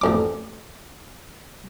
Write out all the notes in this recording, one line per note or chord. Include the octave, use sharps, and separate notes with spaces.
A1 F2 D6